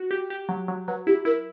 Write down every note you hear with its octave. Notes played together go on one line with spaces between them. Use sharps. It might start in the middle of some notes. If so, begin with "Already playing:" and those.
Already playing: F#4
G4
G4
F#3
F#3
F#3 B4
E4 G4
E4 A#4